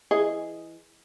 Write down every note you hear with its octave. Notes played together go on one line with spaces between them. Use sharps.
E3 G#4 D#5